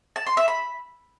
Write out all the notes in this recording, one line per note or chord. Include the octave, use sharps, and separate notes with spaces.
A5
C6
E5
B5